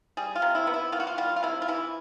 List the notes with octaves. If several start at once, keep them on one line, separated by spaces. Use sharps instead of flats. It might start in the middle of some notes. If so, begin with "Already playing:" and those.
G3 G#4
F4
C3
E4
B3
E4
D#3 F4
F#4
F4
G3 F4
F4
C3 E4
F4
E3 E4